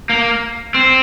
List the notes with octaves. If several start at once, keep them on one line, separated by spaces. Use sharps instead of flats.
A#3
C4